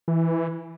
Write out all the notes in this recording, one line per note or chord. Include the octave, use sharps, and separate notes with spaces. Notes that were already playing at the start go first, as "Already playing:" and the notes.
E3